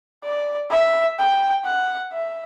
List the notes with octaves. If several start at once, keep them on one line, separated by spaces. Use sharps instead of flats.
D5
E5
G5
F#5
E5